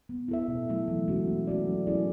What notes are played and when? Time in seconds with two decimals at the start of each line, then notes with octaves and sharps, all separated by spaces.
0.09 B3
0.28 E4 A4 E5
0.48 B2
0.69 F#3 A3 E4 A4
0.88 E3
1.08 G#3 C#4 F#4
1.27 A3
1.47 C#4 F#4 A4 D5
1.67 F#3
1.87 C#4 E4 G#4 D5